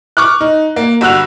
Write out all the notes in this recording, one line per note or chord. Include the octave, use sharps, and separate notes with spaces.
C#6 D6 F6 F#6
D#4
A#3
G1 F#4 E6 F#6 F7